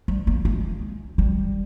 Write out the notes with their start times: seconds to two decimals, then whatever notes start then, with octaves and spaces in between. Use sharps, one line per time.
0.08 G3
0.27 A#3
0.45 G#3
1.18 G3